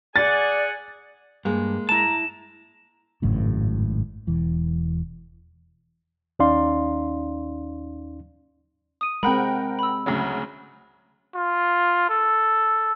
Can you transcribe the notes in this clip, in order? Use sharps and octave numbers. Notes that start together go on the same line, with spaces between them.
G#4 D5 F#5 G#5 A6
G2 G#3 A#3
E4 A5 A#5 E7
G#1 F#2 A2 C#3
E1 E3
D#2 C#4 D#4 D5 F5 C6
D#6 D#7
G#3 C4 A#4 F#5 G5 B5
B5 E6
D2 C#3 F#3
F4
A4